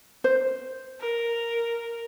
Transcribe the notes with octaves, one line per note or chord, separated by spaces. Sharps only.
C5
A#4